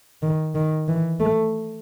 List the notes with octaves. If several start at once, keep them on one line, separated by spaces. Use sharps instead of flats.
D#3
D#3
E3
A3